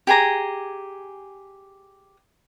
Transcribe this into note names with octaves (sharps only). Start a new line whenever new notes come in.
G4 G#4 G#5 A#5